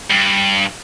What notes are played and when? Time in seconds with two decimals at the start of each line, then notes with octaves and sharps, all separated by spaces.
0.11 G2